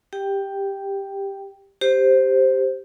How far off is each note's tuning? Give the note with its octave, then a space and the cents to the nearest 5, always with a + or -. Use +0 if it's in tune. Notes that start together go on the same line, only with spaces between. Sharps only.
G4 +10 G5 +0
G4 +0 C5 +0